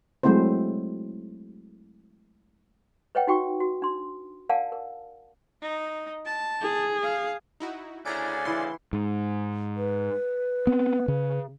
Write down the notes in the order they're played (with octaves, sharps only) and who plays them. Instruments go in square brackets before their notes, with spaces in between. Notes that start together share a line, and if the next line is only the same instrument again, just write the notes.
[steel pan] F#3 G#3 A3 C4 E4 C5
[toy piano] B4 C#5 D#5 F#5 G5
D#4 F#4 G5 C#6
F#4
D4 C6
A#4 D5 F5 F#5 G#5 A5
A#4
[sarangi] D#4
A5
[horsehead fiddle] G#4
[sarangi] F5
[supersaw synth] D#4 E4 F#4
[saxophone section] D2 C#3 [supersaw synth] E4 A#5 D7 [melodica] D5 G#5
[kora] E3 E4 F#5 [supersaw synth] C6
[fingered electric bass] G#2
[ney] B4
[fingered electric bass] B3 C4
C#3